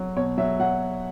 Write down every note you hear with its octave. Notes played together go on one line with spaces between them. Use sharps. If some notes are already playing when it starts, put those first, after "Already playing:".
Already playing: F#3
B2 C#5
F#3 E5
F#3 F#5